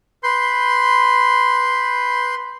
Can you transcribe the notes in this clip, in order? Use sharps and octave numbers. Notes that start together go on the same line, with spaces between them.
B4 C6 G6